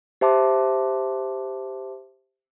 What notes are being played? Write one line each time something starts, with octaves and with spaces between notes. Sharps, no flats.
G4 C5 E5 A5 C6 D6